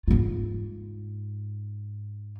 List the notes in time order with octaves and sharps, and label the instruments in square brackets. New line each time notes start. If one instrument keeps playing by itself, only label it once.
[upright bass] G#2 F4